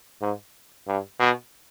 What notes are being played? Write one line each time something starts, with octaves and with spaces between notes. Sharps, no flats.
G#2
G2
B2